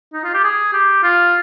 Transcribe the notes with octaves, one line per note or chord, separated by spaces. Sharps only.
D#4
F4
G4
G#4
G4
F4